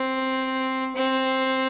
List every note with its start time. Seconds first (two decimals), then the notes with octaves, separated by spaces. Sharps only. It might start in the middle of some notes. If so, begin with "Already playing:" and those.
Already playing: C4
0.96 C4